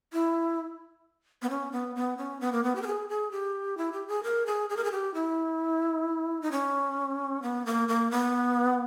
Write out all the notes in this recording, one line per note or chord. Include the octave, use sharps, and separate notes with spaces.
E4
B3
C#4
B3
B3
C#4
B3
A#3
B3
G4
A#4
G#4
G#4
G4
E4
G4
G#4
A#4
G#4
G#4
A#4
G#4
G4
E4
D#4
C#4
B3
A#3
A#3
B3